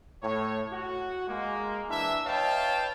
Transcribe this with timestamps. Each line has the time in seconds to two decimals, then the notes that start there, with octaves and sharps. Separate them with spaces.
0.22 A2 C#5
0.72 F#4
1.27 G#3 A#3
1.89 E3 D4 E4 E5
2.26 B4 C#5 D#5 F5 G5 A5